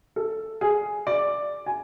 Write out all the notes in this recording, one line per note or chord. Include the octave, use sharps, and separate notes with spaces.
A4
G#4
D5
G#5